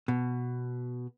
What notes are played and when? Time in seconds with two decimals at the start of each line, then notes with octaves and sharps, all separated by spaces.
0.08 B2